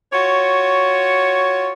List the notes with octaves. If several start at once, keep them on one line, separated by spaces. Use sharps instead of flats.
F4 F#4 C#5